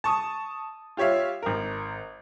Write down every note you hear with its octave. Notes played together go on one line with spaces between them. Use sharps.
A5 C#6 D#6
F4 G4 C#5 E5 F5
G#1 A#4